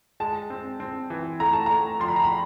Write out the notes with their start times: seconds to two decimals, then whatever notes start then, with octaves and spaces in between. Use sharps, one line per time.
0.20 G#3 A5
0.50 C4
0.80 C4
1.10 E3
1.40 A3 A#5
1.53 A5
1.66 A3 A#5
2.00 F3 C6
2.08 B5
2.16 A#5
2.24 B5